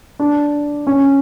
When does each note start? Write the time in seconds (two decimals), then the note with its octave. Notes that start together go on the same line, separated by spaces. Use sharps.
0.19 D4
0.87 C#4